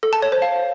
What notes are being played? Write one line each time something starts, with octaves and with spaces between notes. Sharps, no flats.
A4
A5
C#5
C5
F5